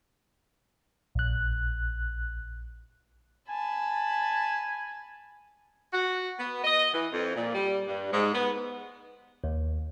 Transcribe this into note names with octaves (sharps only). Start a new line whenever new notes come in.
A#1 F#6
G#5 A5 B5
F#4
B3
D#5
E3
F2
A#2
G3
G2
G#2
B3
D#2